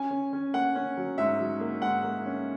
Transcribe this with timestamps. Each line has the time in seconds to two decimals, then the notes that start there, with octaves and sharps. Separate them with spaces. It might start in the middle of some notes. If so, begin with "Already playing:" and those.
Already playing: C#4 G#5
0.11 C#4
0.33 C#4
0.54 A#3 F#5
0.75 C#4
0.97 F#3
1.18 G#2 E5
1.40 F#3
1.60 A#3
1.82 G#2 F#5
2.04 A#3
2.26 C#4